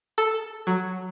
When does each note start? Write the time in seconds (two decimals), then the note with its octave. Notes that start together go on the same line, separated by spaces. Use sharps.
0.18 A4
0.67 F#3